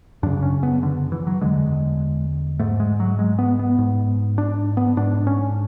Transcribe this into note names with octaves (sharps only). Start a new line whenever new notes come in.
F#2 C#3 D4
C#4
B3
D3
E3
F#3
E2 D3 G#3
G#2 A3
G#3
F#3
G#3
B3
B3
G#2
D4
B3
G#2 D4
C#4